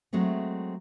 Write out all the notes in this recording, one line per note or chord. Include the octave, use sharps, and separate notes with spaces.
F#3 G#3 A3 C4